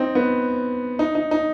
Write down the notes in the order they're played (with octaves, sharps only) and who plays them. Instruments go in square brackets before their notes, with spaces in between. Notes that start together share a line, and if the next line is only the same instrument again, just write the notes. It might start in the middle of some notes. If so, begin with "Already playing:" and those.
Already playing: [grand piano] C4 D#4
B3
D#4
D#4
D#4